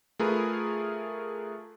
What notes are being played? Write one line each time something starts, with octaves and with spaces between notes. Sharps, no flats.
A3 F4 G#4 A#4 B4